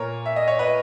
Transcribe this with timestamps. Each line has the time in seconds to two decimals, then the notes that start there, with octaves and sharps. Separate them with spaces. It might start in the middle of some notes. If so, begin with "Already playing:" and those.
Already playing: A#2 A#4 C#5
0.26 E5
0.36 D#5
0.48 C#5
0.59 B4 D#5